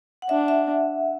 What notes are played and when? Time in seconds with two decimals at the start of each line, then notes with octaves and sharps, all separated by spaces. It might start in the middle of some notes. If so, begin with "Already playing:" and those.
0.22 F#5
0.29 D4 E5
0.48 E5